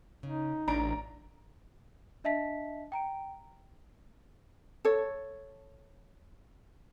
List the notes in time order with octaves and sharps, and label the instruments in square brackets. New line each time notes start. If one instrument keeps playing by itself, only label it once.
[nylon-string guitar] C#3 [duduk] D#4
[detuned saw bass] A1 [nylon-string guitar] D4 [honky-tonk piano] A#5 D7
[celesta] D4 D#5 E5 A5 B6
G5 A#5 D7
[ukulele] A4 C#5